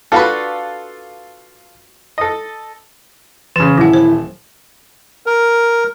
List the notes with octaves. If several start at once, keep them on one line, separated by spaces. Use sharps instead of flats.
D4 F4 F#4 A4 B4
A4 D#5
C#3 E3 E7
D#1 F#3 E4 F#5
C5
A#4